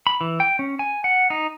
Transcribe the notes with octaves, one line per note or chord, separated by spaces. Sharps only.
B5
E3
G5
C#4
G#5
F#5
D#4